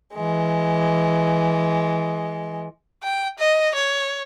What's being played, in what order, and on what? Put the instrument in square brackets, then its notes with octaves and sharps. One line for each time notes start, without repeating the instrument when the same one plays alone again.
[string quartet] E3 G#3
[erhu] G5
D#5
C#5